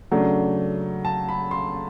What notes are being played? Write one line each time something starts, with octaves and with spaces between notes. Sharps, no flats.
C#3 F#3 A3 D4
A5
B5
C6